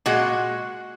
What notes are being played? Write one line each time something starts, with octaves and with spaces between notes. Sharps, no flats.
A#2 G#3 F#4